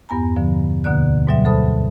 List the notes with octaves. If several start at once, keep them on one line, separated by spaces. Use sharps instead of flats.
E2 G2 B3 G#5 A#5
B2 D3 F3
D2 B2 D3 A#3 D5 F#6
G#2 B2 F#3 G3 E5
D2 A4 C5 A5 B5 D#6